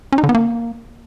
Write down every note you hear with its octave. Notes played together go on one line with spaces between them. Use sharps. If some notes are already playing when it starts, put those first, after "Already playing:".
C#4
D#4
D3
B3
A#3